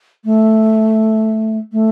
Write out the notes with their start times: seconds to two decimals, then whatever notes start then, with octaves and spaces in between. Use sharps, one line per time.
0.24 A3
1.72 A3